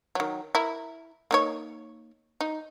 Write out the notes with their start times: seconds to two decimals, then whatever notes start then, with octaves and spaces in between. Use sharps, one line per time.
0.15 D#3 F#3
0.55 E4 A#4
1.31 A#3 D#4 C#5
2.41 D#4